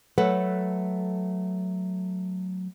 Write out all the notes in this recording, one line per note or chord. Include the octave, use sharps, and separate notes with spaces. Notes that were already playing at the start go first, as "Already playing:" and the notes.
F#3 A3 A4 B4 F#5